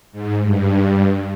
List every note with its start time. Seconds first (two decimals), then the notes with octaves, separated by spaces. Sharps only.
0.12 G#2
0.41 G2